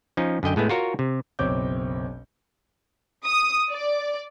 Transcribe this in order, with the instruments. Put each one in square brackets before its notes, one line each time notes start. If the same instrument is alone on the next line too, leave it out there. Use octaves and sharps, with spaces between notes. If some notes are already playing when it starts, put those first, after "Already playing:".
[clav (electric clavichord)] F3 C#4 D#4
F#2 D3 D#5 G5
A2 G#3 A3 B3
F4 F#4 A#4 C#5
C3
[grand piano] F#1 B1 C4 C#5 D6 G6
[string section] D#6
D5